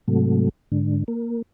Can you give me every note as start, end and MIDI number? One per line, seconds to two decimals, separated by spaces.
0.08 0.49 44
0.08 0.49 48
0.08 0.49 54
0.08 0.49 57
0.72 1.04 44
0.72 1.04 50
1.08 1.42 58